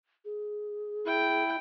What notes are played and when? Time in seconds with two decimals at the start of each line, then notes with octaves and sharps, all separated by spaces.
0.25 G#4
1.06 E4 G5